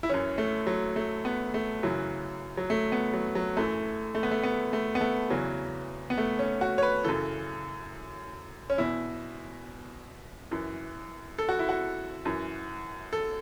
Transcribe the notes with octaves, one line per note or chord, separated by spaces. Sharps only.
E4
F#2 E3 C#4
A3
F#3
A3
B3
A3
F#2 C#3 E3 F#3
F#3
A3
B3
F#3
F#3
F#2 E3 A3
A3
B3
A3
B3
A3
B3
A3
E2 C#3 E3 F#3
B3
A3
C#4
F#4
C#5
B4
F#2 C#3 E3 A4
C#4
E2 B2 E4
F#2 E3
A4
F#4
E4
F#4
F#2 E3
A4